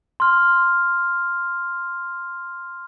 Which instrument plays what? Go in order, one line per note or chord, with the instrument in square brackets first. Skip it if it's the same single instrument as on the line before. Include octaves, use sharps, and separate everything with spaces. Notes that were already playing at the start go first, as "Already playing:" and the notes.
[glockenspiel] C6 F6